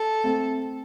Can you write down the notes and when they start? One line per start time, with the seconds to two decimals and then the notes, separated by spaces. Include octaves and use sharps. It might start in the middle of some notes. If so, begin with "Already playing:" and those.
Already playing: A4
0.24 A3 C4